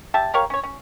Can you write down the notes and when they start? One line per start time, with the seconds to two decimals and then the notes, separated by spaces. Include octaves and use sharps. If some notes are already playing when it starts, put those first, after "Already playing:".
0.14 G4 E5 A5
0.34 G4 A#4 C#5 F5
0.50 C#4 C#5
0.63 C#4